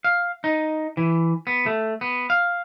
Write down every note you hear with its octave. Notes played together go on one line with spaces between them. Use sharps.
F5
D#4
E3
B3
A3
B3
F5